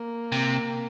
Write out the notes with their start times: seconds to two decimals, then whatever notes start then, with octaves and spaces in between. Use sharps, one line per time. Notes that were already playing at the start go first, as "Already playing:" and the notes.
Already playing: A#3
0.32 C3